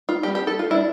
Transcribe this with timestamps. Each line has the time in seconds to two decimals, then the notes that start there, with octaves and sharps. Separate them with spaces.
0.09 F4
0.23 G3 C4 G4
0.35 G4
0.47 A4
0.59 F4
0.70 G3 E4
0.74 D4